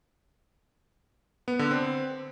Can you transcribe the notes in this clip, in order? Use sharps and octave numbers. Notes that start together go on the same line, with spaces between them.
B3
D3
C4